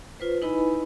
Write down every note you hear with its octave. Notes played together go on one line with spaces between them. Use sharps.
F4 B4 C5
D#4 E4 B4 D#5 G#5 B5